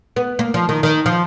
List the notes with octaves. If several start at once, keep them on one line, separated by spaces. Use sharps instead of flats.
B3
A#3
F3
D#3
D#3
F3